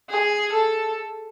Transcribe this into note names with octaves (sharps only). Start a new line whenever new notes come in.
G#4
A4